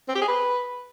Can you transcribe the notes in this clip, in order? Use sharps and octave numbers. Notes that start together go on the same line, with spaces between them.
C4
G4
G#4
B4